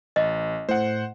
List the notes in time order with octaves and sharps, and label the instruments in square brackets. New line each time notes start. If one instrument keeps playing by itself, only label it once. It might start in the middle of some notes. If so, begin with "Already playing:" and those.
[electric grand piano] A1 [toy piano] D#5
[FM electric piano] A2 [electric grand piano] C5 F#5